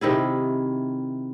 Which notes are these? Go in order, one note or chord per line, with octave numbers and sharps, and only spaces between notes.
C3 D#3 E4 G#4